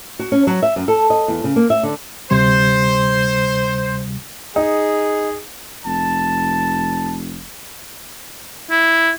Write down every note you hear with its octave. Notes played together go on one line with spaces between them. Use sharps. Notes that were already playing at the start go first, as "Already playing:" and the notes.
F#4
C#4
F#3
E5
F#2
A4
D#5
E2
C#3
A#3
E5
D3
D2 C3 G3 C5
D#4 G#4
F1 A5
E4